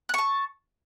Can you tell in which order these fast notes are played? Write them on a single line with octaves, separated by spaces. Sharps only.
F#6 C#6 A5